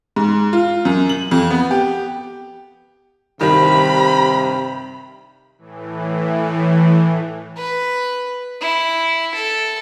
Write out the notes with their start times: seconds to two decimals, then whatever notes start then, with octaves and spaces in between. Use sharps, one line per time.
0.16 G#2
0.53 F4
0.85 F#2
1.09 F#7
1.31 F2
1.51 B3
1.71 G4
3.41 G2 C3 D#3 B5
5.58 A2 E3
7.57 B4
8.61 E4
9.35 A4